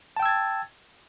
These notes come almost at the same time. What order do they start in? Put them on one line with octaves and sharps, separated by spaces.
A5 G5 E6 G#6 A6